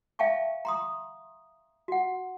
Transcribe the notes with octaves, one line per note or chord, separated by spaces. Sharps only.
E5 F5 G5 A5 C#6
A#5 C6 D#6
F#4 F#5